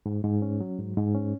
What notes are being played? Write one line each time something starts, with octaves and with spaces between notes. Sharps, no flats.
G#2
G#2
C#4
F#3
G#2
G#2
C#4